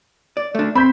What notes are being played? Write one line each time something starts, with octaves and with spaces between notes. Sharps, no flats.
D5
A3 D4
C4 B5 G6 B6